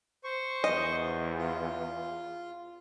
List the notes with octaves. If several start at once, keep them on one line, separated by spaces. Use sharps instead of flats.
C5 C#6
E2 D#5
F4